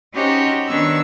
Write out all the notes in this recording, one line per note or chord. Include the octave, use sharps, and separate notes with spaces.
C#4 D#4 F#4 G4 C5 C#5
D#3 B3 D4 C#5 C#6 E6